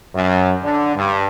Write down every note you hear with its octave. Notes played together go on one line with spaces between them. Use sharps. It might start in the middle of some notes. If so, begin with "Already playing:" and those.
F#2
D3
G2